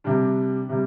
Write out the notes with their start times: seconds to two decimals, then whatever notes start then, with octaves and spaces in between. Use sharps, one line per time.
0.04 C3 G3 D4
0.69 C3 G3